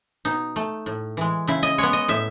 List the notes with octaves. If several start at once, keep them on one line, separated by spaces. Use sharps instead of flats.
B2 D#4
A3
A2
E3 G#3
C#3 E4
D#5
G#3 B3 C#5
D#5
A2 E5